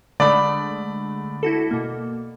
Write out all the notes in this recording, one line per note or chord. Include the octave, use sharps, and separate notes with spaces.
D3 G#3 A3 D5 B5
E4 F#4 A4
B2 A#3